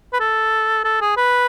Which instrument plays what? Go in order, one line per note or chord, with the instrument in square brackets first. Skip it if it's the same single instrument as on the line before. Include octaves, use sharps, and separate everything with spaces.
[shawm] B4
A4
A4
G#4
B4